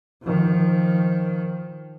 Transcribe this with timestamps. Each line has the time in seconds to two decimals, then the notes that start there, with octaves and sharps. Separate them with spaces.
0.22 D#3 F3